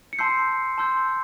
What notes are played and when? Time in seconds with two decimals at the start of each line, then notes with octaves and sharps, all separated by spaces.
0.13 C#7
0.19 A5 C6 E6 G6 C7
0.78 A5 C6 E6 G6